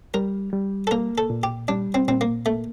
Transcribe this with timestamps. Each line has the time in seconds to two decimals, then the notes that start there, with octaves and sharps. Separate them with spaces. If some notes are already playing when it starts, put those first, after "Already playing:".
0.14 G3 A#4
0.53 G3
0.87 A4
0.91 A#3 A#4
1.18 A4
1.30 A#2
1.43 G4
1.68 G3 D4
1.94 C4
2.08 A#2 C4
2.21 A#3
2.46 A3 A#3